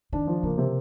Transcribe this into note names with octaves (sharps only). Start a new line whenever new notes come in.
D#3 D4
F3
C#3 A#3
C3